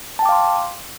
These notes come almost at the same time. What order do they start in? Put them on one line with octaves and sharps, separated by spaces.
A5 G5 D6 F5 C6